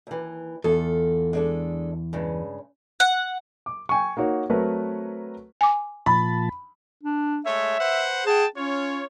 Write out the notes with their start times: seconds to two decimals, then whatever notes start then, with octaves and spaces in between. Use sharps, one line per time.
0.07 D#2 E3
0.64 E2 F4 A4
1.33 G#3 D4 A4
2.13 G2 C#3 G#3
3.00 F#5
3.66 D6
3.89 G5 G#5 C#6
4.17 A#3 D#4 F#4 C#5
4.50 F#3 A3 C4 A#4 B4 C#5
5.61 G#5 D6
6.06 A#2 F3 A5 B5
7.03 D4
7.45 G#3 A3 C#5 E5
7.79 B4 C5 F#5
8.26 G#4 F#5 G5 A5
8.56 C#4 F4 C#5